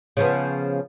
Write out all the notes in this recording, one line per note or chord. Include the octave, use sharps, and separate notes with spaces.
C#3 F3 B3